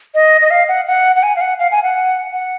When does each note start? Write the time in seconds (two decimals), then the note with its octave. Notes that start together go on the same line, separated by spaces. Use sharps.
0.15 D#5
0.41 D#5
0.51 F5
0.68 F#5
0.87 F#5
1.16 F#5
1.23 G#5
1.36 F5
1.41 F#5
1.59 F5
1.71 G#5
1.83 F#5
2.32 F#5